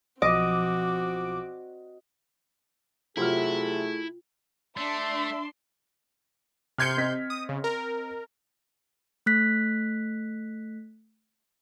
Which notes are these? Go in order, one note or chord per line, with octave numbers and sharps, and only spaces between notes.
B1 F3 C4 F#4 D#5 D6
C3 F#3 A3 E4 F4 G#4 F6
A3 D4 E5 C6
C3 C6 F6 G6 G#6 C#7
C4 D#5 B6
D#6
C#3
A#4
A3 F#6 B6